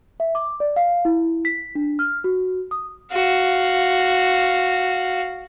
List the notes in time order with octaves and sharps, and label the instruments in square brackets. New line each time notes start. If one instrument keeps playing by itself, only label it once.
[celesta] E5
D6
D5
F5
E4
B6
D4
F6
F#4
D#6
[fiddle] F#4 F5